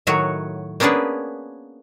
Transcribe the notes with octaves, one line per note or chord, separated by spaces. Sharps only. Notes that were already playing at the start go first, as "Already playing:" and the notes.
A2 D#3 F#3 F#4 C#5
A#3 B3 C#4 D4 G#4 B4